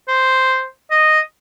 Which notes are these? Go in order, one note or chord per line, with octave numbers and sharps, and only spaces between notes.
C5
D#5